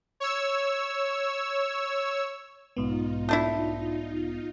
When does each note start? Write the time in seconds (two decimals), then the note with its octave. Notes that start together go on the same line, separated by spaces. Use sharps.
0.20 C#5 E6
2.77 B1 G#2 B3 D#4 F4
3.29 A3 D4 E4